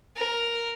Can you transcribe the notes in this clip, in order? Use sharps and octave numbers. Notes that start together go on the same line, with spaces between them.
A#4